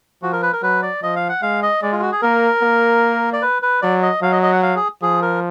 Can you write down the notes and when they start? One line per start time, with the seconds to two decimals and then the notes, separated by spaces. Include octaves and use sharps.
0.23 F3 F#4
0.32 A#4
0.43 B4
0.53 A#4
0.62 F#3 B4
0.82 D5
1.03 F3 D#5
1.16 F5
1.29 F#5
1.42 G#3 F5
1.62 D#5
1.82 G#3 D5
1.92 F4
2.02 F#4
2.12 G#4
2.22 A#3 A#4
2.62 A#3
3.33 D5
3.42 B4
3.62 B4
3.82 F#3 D5
4.02 D#5
4.22 F#3 F5
4.32 D#5
4.42 D#5
4.52 F#5
4.63 F5
4.76 G#4
5.02 F3 G#4
5.22 A#4